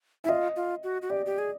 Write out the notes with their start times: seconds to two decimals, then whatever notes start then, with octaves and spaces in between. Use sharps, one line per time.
0.24 E4 E5
0.29 F4 D#5
0.56 F4
0.83 F#4
1.02 F#4
1.10 G4 D5
1.26 G4
1.38 G#4